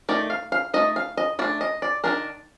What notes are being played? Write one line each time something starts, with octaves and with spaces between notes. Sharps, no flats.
D#3 A3 D#4 D5
F5
F5
A3 D#4 D#5
F5
D#5
A3 D4 D5
D#5
D5
D#3 A#3 D4 A#4